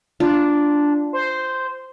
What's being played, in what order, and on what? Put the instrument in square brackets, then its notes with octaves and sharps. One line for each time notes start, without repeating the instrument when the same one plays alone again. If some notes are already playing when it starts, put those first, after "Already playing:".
[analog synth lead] D4 [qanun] F4
[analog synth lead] C5